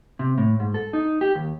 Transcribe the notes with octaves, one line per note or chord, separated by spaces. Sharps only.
C3
A2
G#2
A4
D#4
G4
D#2